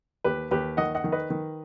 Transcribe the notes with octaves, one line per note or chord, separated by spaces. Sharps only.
D#2 G4 B4
D#2 G4 B4
D#3 D#5 F#5
D#5 F#5
D#3
B4 D#5
D#3